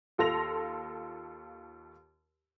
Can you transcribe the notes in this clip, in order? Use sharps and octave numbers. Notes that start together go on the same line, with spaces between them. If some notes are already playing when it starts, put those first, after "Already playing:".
D#2 F4 A4 C6 A#6 F7